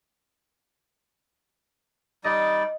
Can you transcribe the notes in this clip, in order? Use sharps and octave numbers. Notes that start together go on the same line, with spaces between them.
G3 D#4 D5 D#5